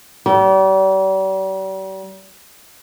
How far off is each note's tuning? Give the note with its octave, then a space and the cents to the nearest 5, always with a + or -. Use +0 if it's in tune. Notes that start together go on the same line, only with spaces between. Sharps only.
G3 -40